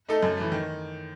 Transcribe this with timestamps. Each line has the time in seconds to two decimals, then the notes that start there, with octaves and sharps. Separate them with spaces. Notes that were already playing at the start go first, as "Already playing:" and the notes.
0.08 A3 D#4 A4
0.23 F#2
0.37 E3 A3
0.52 D#3